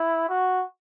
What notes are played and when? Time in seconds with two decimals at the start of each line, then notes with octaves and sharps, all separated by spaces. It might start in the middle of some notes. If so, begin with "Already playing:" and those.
Already playing: E4
0.29 F#4